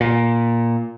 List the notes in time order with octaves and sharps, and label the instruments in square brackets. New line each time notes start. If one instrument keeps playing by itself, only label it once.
[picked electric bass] A#2